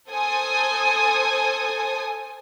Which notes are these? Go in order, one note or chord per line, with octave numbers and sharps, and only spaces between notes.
A4 C5 G#5 D#6